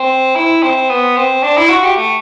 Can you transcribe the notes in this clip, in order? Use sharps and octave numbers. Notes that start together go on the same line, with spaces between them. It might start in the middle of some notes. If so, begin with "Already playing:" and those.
Already playing: C4
E4
C4
B3
C4
D4
E4
F#4
G4
A3